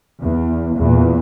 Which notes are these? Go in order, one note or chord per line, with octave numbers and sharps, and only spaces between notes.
E2
E2 A#2